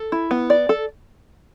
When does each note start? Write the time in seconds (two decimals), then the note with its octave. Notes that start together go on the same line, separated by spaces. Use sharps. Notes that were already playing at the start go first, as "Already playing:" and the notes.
Already playing: A4
0.12 E4
0.31 B3
0.50 D5
0.69 A4